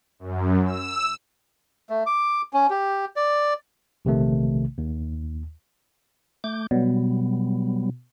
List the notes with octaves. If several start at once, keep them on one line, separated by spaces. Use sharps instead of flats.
F#2
E6
A3
D6
C#4
G4
D5
A#1 C3 D#3 A3
D#2
A3 D6 G6
B2 F#3 G3 B3